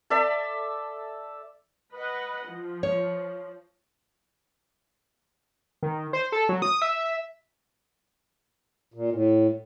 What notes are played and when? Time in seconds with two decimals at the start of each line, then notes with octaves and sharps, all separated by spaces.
0.10 A4 D5 E5 A5
1.94 B4 D#5 F#5
2.50 F3
2.83 C#5
5.83 D#3
6.13 C5
6.32 A4
6.49 F#3
6.62 D#6
6.82 E5
8.94 A#2
9.12 A2